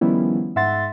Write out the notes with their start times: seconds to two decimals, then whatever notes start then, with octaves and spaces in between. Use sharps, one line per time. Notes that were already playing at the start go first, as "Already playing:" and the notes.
0.01 D#3 F3 G3 B3 C#4 E4
0.56 G#2 E5 F#5 C6 A6